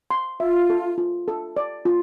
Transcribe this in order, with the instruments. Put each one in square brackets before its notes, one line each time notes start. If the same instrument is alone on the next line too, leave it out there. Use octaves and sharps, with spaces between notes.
[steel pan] C6
[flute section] F4 [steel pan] E5
[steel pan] A4
F4
A4
D5
F4